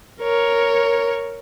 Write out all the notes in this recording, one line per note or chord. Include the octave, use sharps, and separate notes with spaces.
A#4 C#5